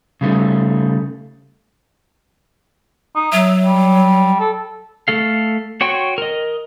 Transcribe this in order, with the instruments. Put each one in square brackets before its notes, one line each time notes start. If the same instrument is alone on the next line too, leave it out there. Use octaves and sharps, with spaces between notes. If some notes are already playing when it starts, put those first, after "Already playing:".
[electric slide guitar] C#3 G3 A3 D#4
[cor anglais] D#4
[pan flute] F#3 [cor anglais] E5
[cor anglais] G3
A4
[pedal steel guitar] A3 A4 F5
F#4 C#5 G5 C6 C#6
A#4 D#5